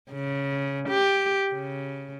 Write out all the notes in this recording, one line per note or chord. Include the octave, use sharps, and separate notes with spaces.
C#3
G4
C#3